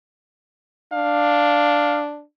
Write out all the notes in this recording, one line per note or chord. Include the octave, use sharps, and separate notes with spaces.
D4 F5